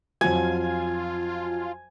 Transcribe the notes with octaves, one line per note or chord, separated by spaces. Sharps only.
F2 F#3 F4 G#5